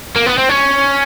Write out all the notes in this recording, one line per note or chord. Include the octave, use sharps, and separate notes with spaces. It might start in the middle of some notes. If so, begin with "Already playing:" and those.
A#3
B3
C4
C#4